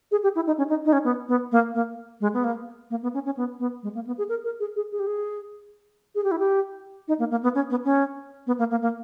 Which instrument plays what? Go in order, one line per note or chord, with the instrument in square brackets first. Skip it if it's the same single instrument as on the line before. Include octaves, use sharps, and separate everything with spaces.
[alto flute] G#4
G4
E4
D#4
C#4
D#4
D#4
C#4
B3
B3
A#3
A#3
G#3
B3
A#3
A#3
B3
C#4
C#4
B3
B3
G#3
A#3
B3
G#4
A#4
A#4
G#4
G#4
G#4
G4
G#4
G#4
G4
E4
G4
D#4
A#3
A#3
B3
C#4
B3
C#4
B3
A#3
A#3
A#3